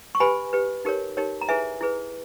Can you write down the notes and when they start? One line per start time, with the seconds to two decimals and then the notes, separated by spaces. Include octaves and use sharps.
0.15 C#6
0.20 G4 B4 G#5 B5
0.53 G4 B4
0.85 D#4 G4 A#4 C#5
1.17 D#4 G4 A#4 C#5
1.41 A#5
1.49 E4 G#4 B4 E5 G#5
1.81 E4 G#4 B4